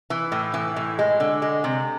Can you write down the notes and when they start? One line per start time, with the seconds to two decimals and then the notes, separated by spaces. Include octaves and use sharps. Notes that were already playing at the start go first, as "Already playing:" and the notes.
0.10 E3
0.32 A2
0.54 E3
0.76 A2
0.99 G#3
1.20 D3
1.42 G#3
1.64 C3